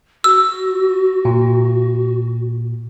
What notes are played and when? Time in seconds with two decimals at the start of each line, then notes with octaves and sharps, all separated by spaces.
0.24 F#4 E6
1.25 A#2